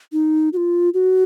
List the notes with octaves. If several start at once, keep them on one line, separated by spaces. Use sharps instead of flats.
D#4
F#4
F4
F#4